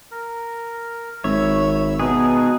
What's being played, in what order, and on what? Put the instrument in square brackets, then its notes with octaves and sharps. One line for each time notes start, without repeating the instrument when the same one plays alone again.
[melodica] A#4
[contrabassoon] G#1 [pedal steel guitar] C#5 [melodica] E5 B5 E6
[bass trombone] B2 [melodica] D#4 B4 [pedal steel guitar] G#4